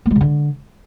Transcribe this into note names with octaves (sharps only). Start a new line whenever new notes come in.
A#3
G#3
C#3
D3